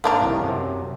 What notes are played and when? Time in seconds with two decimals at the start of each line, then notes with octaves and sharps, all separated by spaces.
0.04 G#2 A#3 D4 G#4 A#4
0.21 C2 A2 D#3
0.42 F#2 C3